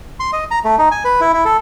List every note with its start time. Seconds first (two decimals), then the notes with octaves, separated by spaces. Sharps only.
0.20 C6
0.33 D#5
0.51 A#5
0.64 A3
0.78 D#4
0.91 G#5
1.05 B4
1.21 E4
1.33 E4
1.45 A4